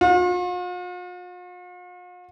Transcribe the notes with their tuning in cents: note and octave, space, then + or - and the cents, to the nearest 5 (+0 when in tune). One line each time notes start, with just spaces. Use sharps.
F4 +45